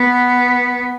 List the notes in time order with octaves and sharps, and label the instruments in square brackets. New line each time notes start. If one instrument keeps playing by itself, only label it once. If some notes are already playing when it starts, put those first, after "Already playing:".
Already playing: [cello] B3